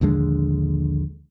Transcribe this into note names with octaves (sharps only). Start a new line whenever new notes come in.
A#1 D#2 D3 G#3